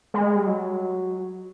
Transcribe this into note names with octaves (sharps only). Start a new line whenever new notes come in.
G#3
G3
F#3